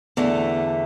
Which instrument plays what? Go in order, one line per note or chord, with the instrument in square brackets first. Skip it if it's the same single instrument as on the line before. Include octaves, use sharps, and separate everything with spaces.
[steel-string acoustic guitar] E2 D3 A3